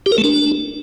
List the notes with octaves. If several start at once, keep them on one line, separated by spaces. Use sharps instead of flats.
G4
A#4
A3
D4